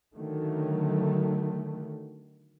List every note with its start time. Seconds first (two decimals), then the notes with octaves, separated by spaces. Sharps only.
0.15 D3 D#3 F#3 A3